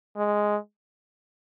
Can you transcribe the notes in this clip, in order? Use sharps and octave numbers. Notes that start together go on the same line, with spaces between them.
G#3